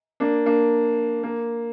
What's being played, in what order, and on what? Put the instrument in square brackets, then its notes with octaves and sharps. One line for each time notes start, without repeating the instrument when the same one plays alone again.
[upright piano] A#3 D4
A#3 D4
A#3